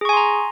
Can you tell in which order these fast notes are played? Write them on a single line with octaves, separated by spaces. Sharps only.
G#4 C#6 G#5 C6 A#5